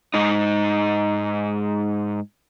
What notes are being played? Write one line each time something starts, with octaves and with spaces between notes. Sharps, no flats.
G#2 D#4